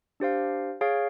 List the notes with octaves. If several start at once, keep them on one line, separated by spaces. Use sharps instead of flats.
D4 G4 C5 F5
G#4 C#5 F5